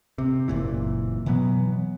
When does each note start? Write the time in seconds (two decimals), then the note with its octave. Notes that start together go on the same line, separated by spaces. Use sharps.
0.18 C3
0.48 F#1 A#2 E3
1.26 B2 E3 F#3 B3